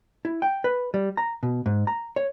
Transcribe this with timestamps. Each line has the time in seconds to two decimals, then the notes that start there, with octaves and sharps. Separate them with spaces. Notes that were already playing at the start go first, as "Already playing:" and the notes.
0.25 E4
0.42 G5
0.64 B4
0.94 G3
1.17 A#5
1.43 B2
1.66 G#2
1.87 A#5
2.16 C#5